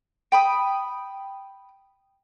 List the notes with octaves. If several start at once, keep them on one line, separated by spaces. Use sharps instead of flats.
G5 B5 D#6